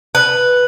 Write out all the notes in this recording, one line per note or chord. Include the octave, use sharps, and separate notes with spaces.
B4